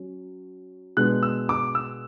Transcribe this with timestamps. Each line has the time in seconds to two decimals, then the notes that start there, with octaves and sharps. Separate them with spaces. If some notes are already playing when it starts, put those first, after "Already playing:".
Already playing: F#3 C#4
0.97 B2 G#3 B3 D4 F#6
1.23 E6
1.49 D6
1.75 E6